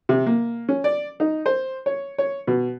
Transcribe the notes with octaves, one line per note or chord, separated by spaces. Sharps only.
C3
A#3
C#4
D5
D#4
C5
C#5
C#5
B2